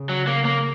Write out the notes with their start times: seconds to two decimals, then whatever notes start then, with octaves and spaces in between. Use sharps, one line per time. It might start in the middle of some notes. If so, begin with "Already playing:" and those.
Already playing: C#3
0.09 F#3
0.27 A#3
0.45 A#3